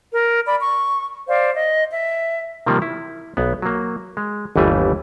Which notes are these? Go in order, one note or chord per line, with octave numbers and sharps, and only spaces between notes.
A#4
D5 B5
C#6
C5 D5 F5
D#5
E5
C3 D#3 F3 G3 A#3
E4
B1 B3
F#3 A#3
G#3
G1 D#2 E3 G3 A3 G#5